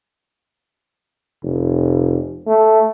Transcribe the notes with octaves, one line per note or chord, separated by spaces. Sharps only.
F1
A3